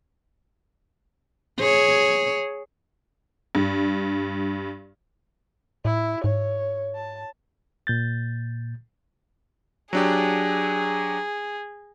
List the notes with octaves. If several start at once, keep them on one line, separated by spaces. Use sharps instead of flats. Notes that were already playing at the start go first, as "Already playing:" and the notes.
G#4 C#5
G2
A2 E4
G#2 C#5
A5
A#2 G6 A6
F#3 D4 G4 G#4